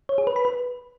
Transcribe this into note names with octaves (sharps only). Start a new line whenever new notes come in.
C#5
G#4
B4
B5
B4